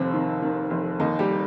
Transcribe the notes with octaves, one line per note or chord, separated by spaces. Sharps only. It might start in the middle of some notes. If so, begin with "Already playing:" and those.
Already playing: F1 D#2 C3 C4
D#3
D#3
F1
D#2 D#3 D#4
G3 G4